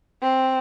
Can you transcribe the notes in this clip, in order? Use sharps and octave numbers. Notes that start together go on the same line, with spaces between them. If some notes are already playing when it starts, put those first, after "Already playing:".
C4